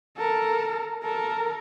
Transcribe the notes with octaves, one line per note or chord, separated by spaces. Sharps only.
A4 A#4
A4 A#4